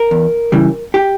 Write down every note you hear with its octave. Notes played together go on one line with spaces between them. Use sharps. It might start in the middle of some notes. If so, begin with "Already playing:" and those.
Already playing: A#4
E2
C#3 E3 G3
G4